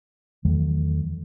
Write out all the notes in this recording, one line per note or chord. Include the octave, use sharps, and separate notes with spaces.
E2 D#3 F#3 A3